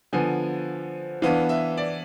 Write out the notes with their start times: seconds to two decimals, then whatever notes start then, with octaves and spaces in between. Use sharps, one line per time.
0.13 D3 F3 B3 G#5
1.22 E3 B3 D4 F5
1.49 E5
1.77 D5